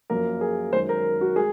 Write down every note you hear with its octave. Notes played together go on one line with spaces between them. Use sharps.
F#2 F3 A#3 A#4
G#4
F#2 D#3 G#3 C5
A#4
F#4
G#3 G#4